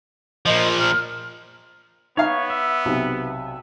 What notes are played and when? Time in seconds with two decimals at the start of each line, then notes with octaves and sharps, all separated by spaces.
0.46 A#2 F3 D#5
0.79 F6
2.17 B3 D#4 C#5 F5
2.50 E5
2.85 B1 C3